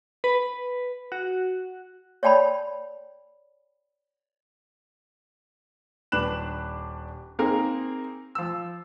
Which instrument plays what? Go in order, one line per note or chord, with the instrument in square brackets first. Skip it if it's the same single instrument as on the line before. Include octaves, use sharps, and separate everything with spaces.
[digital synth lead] B4
F#4
[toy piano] C#5 D5 G5 A5 B5
[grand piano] D#1 D4 B4 F#6 E7
A#3 C4 D#4 G#4 A#4
F3 E6